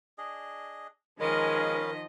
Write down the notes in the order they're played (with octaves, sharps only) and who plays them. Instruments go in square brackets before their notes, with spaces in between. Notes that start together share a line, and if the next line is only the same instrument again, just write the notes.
[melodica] D4 G#4 D#5
[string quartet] D#3 F3 D#5 [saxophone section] G#3 [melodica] C#4 B4 F5 [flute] A#4